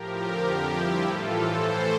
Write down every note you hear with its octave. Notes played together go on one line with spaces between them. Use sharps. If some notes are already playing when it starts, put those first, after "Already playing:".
Already playing: A2 F3 G4 A#4
F2 D3 F3
G2 F3 E4 G4
A2 E3 F4 A4
A2 E3 A4 C5